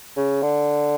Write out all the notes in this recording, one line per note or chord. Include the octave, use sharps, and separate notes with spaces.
C#3
D3